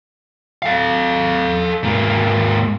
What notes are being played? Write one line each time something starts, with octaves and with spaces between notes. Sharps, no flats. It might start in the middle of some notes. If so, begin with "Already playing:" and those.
A4 F5
G#2 A#3